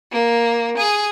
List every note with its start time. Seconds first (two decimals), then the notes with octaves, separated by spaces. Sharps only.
0.12 A#3
0.77 G#4